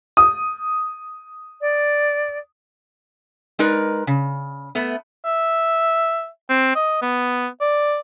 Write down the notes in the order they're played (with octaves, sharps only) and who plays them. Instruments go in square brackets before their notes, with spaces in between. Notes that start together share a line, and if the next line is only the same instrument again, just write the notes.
[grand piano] D#6
[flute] D5
[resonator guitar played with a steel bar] G#3 D#4 A#4 B4 D5
C#3
A3 B3
[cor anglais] E5
C4
D#5
B3
D5